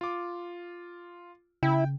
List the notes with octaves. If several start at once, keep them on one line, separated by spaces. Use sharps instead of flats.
F4 D6
C#3 E4 G5